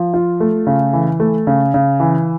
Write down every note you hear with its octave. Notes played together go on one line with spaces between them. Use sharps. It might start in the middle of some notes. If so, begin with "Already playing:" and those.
Already playing: F3
F4
A3
C#3
E3
A3
C#3
C#3
E3